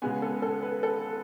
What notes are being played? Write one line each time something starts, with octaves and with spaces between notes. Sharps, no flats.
C#3 G#3 B3 G#5
A4
A4
B4
A4